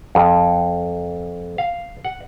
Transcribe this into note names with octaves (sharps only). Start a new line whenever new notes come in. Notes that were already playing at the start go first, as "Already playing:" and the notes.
F2
F5
F#5